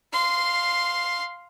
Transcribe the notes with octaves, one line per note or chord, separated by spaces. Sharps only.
F5 C6